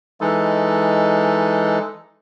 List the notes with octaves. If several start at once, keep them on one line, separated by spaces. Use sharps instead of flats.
E3 G#3 D#4 A4